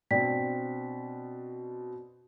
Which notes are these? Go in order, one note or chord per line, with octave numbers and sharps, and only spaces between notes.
B2 C4 D4 D5 G5 B6